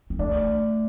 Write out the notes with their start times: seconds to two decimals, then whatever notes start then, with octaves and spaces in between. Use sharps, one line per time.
0.10 C4
0.19 A3 D4